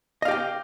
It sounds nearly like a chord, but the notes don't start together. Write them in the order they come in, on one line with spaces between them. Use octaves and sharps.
D#5 F5 G4 G5